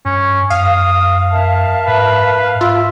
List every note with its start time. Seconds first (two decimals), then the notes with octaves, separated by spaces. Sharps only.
0.05 G2 C#4
0.50 F#2 F5 D#6
1.31 A#4 E5 A5
1.88 G#2 B4
2.61 F4 E5